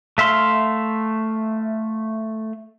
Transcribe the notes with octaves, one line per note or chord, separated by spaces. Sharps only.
A3 E5 F5 C6